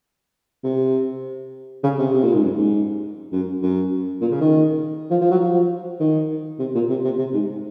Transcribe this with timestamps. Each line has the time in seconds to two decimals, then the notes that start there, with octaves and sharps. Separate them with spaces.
0.64 C3
1.83 C#3
1.98 C3
2.14 C3
2.24 A#2
2.33 G#2
2.43 F#2
2.58 G#2
3.32 F#2
3.62 F#2
4.21 A#2
4.31 C#3
4.41 D#3
5.10 F3
5.21 F3
5.31 F#3
5.41 F3
6.00 D#3
6.59 C3
6.75 A#2
6.89 C3
7.04 C3
7.19 C3
7.34 G#2